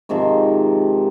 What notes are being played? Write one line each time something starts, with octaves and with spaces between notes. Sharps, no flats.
G#2 C3 D#3 F3